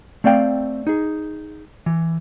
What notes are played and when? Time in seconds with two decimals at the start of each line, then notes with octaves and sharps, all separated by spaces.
0.24 A3 C4 D5 F5 G5
0.87 D#4 G#4
1.86 E3